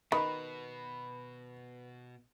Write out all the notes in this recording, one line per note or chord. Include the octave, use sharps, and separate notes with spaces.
B2 D#3 B4 B5